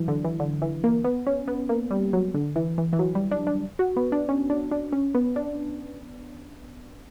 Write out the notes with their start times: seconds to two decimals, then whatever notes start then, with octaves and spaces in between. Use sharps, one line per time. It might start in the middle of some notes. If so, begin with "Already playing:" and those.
Already playing: E3 F#3
0.08 D3
0.25 E3
0.40 D3
0.62 E3
0.84 A#3
1.04 B3
1.27 C#4
1.48 B3
1.69 A#3
1.91 G3
2.13 F#3
2.34 D3
2.56 E3
2.78 E3
2.93 E3
2.99 F#3
3.15 G3
3.31 D4
3.47 D4
3.79 F#4
3.97 B3
4.12 D4
4.29 C#4
4.50 D4
4.72 D4
4.93 C#4
5.15 B3
5.36 D4